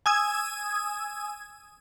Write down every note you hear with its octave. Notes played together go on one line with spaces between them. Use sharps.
G#5 D#6 E6 G#6